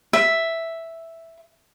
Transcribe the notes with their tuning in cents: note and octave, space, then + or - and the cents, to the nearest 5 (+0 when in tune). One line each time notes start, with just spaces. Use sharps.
E5 +0